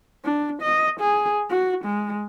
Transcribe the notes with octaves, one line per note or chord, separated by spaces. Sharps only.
D4
D#5
G#4
F#4
G#3